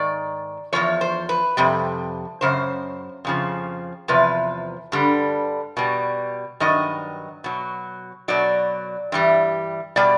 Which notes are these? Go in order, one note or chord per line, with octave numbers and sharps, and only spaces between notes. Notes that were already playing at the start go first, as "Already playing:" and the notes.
Already playing: G#2 D#3 D5
E2 C3 F3 C#5
C5
B4
F2 C3 G3
F#2 C#3 C5
F2 C#3 F3
E2 C3 F3 B4
G2 D3 G3
B2 G3
G2 D#3 F#3 D#5
B2 F#3
B2 F#3 D5
G2 E3 G3
B2 G3 D5